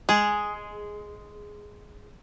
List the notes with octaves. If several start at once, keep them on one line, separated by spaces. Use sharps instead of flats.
G#3 G#4